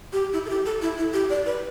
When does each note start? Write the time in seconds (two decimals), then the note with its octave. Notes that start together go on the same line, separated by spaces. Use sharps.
0.13 G4
0.33 E4
0.45 A4
0.50 G4
0.66 A4
0.82 E4
0.98 E4
1.13 G4
1.30 D5
1.46 B4